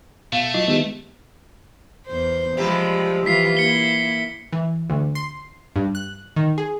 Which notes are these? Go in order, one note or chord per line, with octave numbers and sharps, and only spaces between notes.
B2 A3 F5
F#3 E4 F4 D#5
D#3 G#3 B3 G4 D#5
E2 C5
C3 F3 G3 G#3 G4
E3 F3 F4 B6 C7
A#3 E4 C#7 G7
E3
D2
C6
G2
F#6
D#3
G#4